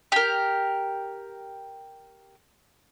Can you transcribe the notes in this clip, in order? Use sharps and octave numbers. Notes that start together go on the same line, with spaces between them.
G4 A#4